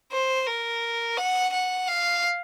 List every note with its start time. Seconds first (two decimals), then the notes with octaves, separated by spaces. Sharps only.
0.12 C5
0.47 A#4
1.17 F#5
1.53 F#5
1.88 F5